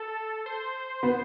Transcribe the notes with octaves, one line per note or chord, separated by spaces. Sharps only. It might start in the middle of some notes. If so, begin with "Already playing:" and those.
Already playing: A4
C5
B3